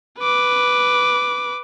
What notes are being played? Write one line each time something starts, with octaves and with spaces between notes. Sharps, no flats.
B4 D6